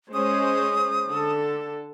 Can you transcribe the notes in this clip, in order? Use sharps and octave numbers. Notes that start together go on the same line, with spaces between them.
G#3 C#4 C5 D#6
D3 A4